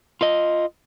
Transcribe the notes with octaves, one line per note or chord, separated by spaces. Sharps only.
F4 D#5